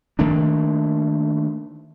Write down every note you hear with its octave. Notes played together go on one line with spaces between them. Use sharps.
D#3 A3 A#3 D4